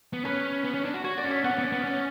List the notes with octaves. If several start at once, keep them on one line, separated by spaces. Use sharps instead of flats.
B3
C#4 B4
B3
C#4
D4
F#4
F#4 C#5
D5
C#4
C#5 E5
B3 D5 F#5
C#4
B3
C#4
B3
C#4